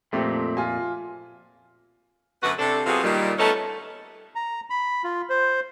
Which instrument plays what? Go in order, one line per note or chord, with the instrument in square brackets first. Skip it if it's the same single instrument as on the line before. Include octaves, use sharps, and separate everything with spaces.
[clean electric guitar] F2 A#2 [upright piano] A3 C4 G4
[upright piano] F4 G#5
[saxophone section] F#2 D3 B3 F#4 B4
C3 D4 A4
C3 F#3 B3 C4 F4 G#4
A#2 D#3 G3
A3 B3 C#4 D#4 A4
[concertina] A#5
B5
F4
C5